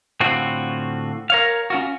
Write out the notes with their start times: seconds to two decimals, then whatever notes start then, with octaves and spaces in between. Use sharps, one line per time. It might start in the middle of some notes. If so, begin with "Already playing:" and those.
0.20 A2 D3 C4 F4 F#4
1.30 A#4 C#5 F5
1.70 C#4 F4 F#4